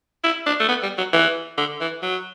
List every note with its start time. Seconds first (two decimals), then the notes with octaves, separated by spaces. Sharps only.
0.24 E4
0.46 D4
0.60 A3
0.69 B3
0.83 G3
0.98 F#3
1.13 E3
1.58 D3
1.81 E3
2.02 F#3